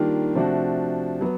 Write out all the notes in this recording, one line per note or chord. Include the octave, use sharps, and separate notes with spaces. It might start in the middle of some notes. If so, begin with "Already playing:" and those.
Already playing: D#3 G3 A#3 D4 F4
C3 F3 A3 D4 F#4
F#3 B3